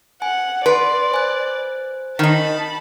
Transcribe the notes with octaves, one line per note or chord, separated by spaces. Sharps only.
F#5 G#5
B4 D5 C6
C5 G#5 F#6
D#3 D#4 A5 B5